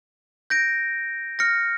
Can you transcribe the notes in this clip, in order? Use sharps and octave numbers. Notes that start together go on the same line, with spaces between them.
G6 A#6 D7
F6 A#6 C#7